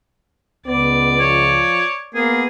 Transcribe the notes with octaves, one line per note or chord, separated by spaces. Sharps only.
C#2 B3 D5
F3 C#5
A#3 B3 G#4